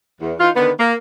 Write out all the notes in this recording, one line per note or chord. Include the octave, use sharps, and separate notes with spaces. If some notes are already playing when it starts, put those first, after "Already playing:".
E2
E3 D#4 F4
D3 D#3 B3
A#3